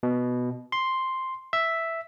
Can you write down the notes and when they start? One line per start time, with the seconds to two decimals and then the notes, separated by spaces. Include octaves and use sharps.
0.03 B2
0.72 C6
1.53 E5